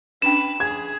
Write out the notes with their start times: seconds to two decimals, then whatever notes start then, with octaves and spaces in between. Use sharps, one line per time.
0.22 C#4 D4 B4 G5 E7
0.60 G#4 G#6